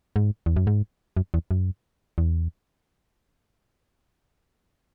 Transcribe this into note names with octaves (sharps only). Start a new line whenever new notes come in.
G#2
E2
F#2
G#2
F#2
E2
F#2
E2